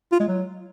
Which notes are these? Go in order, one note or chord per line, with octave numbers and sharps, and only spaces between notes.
F4
G#3
F#3